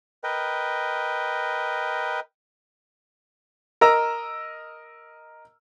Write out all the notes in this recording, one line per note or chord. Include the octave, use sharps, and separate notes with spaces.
A#4 B4 D#5 G5
A#4 D#5 A#5 E6